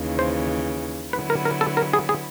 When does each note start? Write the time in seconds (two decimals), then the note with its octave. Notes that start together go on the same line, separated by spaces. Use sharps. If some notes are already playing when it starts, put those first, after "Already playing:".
Already playing: D#2 C#3 E3
0.19 C5
1.13 D3 F#3 B3 E4 B4
1.30 A#4
1.45 A#4
1.61 A4
1.77 A#4
1.93 G#4
2.09 G#4